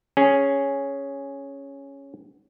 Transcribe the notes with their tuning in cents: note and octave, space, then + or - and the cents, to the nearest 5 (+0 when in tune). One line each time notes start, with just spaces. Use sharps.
C#4 +0 G#4 +0